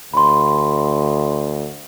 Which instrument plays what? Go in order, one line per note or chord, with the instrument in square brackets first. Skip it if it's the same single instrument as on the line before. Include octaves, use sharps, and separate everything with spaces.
[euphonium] D2 [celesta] B5 C6